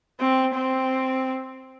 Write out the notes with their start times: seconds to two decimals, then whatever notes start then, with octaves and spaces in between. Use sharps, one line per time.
0.20 C4
0.56 C4